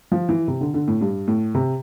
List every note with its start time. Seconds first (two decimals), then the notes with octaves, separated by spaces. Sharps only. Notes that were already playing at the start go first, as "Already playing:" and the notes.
0.12 F3
0.29 E3
0.48 C3
0.61 D3
0.74 D3
0.88 A2
1.01 G2
1.28 A2
1.55 C3